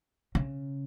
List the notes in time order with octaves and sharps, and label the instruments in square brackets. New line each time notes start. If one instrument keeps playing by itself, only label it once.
[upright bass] C#3